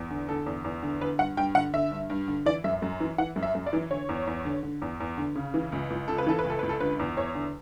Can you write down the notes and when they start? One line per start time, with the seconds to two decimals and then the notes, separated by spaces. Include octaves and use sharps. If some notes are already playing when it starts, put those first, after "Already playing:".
Already playing: E2
0.10 D3
0.29 D3 A4
0.46 E2
0.64 E2
0.83 D3
1.01 D3 B4
1.19 G2 F#5
1.37 G2 G5
1.55 D3 F#5
1.74 D3 E5
1.91 G2
2.10 G2
2.28 D3
2.46 E3 D5
2.64 F#2 E5
2.82 F#2
3.00 E3
3.18 E3 F#5
3.36 F#2
3.43 E5
3.55 F#2
3.66 D5
3.73 E3
3.91 D3 C#5
4.09 E2
4.27 E2
4.45 D3
4.63 D3
4.82 E2
5.00 E2
5.18 D3
5.35 C#3
5.54 E3
5.72 C#2
5.90 C#2
6.08 C#3 A4
6.18 B4
6.27 E3 A4
6.39 B4
6.45 C#2
6.50 A4
6.59 C#2 B4
6.69 A4
6.80 D3 B4
6.99 E2
7.17 E2 C#5
7.35 D3